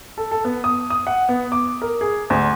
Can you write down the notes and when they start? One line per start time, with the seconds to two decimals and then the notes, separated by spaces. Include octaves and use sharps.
0.18 A4
0.31 A4
0.45 B3
0.64 D#6
0.90 D#6
1.07 F#5
1.29 B3
1.52 D6
1.82 A#4
2.01 G#4
2.30 D2